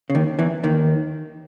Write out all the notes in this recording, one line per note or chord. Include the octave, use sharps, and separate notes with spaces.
C#3
D#2 D#3
E2 E3
D#2 D#3